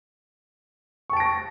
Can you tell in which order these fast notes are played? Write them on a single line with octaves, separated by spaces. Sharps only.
C#6 A5 D7 A#6